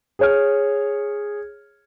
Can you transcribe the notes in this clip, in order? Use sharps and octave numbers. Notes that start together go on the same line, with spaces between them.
G#4 C#5 F6